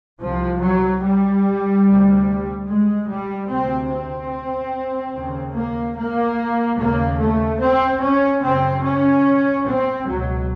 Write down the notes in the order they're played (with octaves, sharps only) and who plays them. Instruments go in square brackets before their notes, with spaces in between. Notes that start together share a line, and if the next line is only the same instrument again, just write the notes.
[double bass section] C2 C3 F3
F#3
G3
D2 C3
G#3
G3
D2 C3 C4
C4
D#2 C#3
A#3
A#3
D#2 C#3 A#3
A3
C4
C#4
F#2 C#3 C4
C#4
C4
C#2 B2 F#3